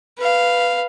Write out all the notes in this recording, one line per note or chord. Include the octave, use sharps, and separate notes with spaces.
B4 F5